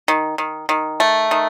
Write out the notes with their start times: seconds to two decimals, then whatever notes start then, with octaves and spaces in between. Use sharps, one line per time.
0.08 D#3
0.38 D#3
0.69 D#3
1.00 A3
1.31 D#3